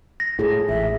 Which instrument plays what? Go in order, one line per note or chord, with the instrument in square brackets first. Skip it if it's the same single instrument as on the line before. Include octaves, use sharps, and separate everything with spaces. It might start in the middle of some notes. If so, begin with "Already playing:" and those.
[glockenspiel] A#6
[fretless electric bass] A2 [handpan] F4 G#4
[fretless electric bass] A1 [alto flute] E5